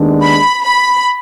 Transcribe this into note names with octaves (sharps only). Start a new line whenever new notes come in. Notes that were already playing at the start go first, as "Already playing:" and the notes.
Already playing: D#2 D#3 G#3 B3 D4
B5
B5